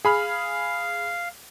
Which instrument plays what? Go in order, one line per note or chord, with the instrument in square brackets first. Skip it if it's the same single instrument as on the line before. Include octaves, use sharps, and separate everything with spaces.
[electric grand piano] G#4 B5 F6 [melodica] F5